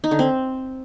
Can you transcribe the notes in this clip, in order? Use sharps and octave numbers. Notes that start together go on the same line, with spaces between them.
D#4
D3
C4